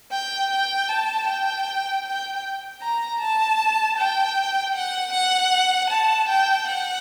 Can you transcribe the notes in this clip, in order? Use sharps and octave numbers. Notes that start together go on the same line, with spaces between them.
G5
G5
A5
G5
G5
A#5
A5
G5
F#5
F#5
A5
G5
F#5